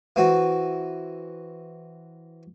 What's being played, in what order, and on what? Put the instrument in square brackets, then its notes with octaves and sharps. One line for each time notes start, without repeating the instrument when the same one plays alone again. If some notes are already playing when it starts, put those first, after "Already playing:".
[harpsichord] E3 C4 F#4